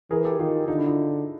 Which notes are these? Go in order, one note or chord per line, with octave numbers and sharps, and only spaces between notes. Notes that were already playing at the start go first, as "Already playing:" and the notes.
E3 G#4 A#4
G4 A4
D#3 F4 G4
D3 D#4 F4
D4 E4
D#4 F4